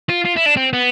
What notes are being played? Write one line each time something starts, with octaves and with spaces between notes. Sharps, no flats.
F4
F4
E4
D4
C4
B3